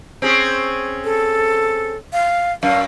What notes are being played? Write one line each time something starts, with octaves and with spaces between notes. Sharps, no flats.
C4 C#4 G#4
A4
F5
F#2 F5